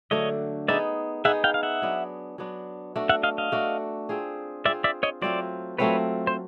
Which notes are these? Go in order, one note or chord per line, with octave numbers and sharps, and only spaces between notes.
D3 F#3 A3 D4 C#5 D#5
B3 D#4 G#4 D5 E5
B3 D#4 G#4 E5 F#5
F5 G5
F5
E5 F#5
F#3 B3 D4
F#3 B3 D4
A3 D4 F#4
E5 F#5
D#5 F5
D#5 F5
A3 D4 F#4
C4 F4 G#4
C4 F4 G#4 D5 E5
D5 E5
C#5 D#5
F#3 A3 C4 F4 C5 D5
F#3 A3 C4 F4 B4 C#5
C5